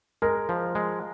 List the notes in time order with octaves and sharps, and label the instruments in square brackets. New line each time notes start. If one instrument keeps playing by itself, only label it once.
[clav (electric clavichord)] G#3 [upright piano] A#4
[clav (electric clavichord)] F3
G#3